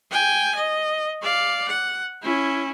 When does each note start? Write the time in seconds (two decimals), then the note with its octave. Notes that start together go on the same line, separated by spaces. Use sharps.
0.11 G5 G#5
0.55 D#5
1.23 D5 F5
1.68 F#5
2.23 C#4 E4